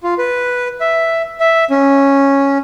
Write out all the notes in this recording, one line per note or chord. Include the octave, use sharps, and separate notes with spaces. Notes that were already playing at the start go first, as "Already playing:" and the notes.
F4
B4
E5
E5
C#4